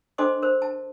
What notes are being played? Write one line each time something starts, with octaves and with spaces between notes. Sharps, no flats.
D4 A4 C5 D#5 C6 D6
A#4 C5
A5